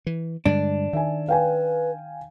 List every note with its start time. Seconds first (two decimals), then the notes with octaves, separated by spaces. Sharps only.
0.06 E3
0.46 G2 D3 G#3 D4
0.93 D#3 E5 G#5
1.28 B4 F5 G5 G#5